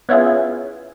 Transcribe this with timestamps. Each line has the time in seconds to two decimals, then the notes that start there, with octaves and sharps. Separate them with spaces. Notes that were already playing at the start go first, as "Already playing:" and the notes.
0.09 B3 C#4 E4 F4 G#4